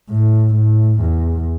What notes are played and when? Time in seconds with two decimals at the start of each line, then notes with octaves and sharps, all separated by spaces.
0.10 A2
0.55 A2
1.00 E2